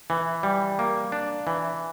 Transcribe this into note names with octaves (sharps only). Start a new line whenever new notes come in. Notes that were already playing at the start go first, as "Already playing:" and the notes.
E3
G3
A#3
D4
E3